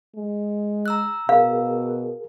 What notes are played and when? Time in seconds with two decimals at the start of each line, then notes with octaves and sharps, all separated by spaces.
0.16 G#3
0.86 A#5 E6 F#6
1.29 B2 G#4 A#4 F5